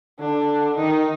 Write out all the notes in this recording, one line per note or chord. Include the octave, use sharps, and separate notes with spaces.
D3 D4
D#3 D#4